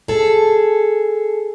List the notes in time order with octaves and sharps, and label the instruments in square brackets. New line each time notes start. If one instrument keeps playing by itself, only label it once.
[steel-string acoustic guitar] G#4 A4